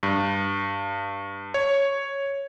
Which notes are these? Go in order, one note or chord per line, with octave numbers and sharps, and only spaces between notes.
G2
C#5